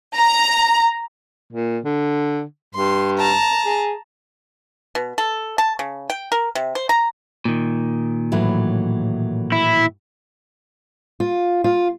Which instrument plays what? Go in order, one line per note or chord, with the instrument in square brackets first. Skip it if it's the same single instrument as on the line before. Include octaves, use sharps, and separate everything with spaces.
[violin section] A#5
[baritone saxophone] A#2
D3
[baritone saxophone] G2 [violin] C6
[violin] A5 A#5
[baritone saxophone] G#4
[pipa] B2
A4
A5
C#3
G5
A#4
C3
C5
A#5
[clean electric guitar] A#2 D#3
[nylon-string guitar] A2 E3 F#3
[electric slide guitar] E4
[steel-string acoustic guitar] F4
F4